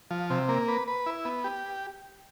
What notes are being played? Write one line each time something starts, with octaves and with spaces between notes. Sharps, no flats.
F3
C3
A#3
B4
B4
E4
B3
G4